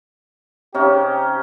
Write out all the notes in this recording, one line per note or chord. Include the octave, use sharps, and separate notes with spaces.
C3 C#4 D#4 G4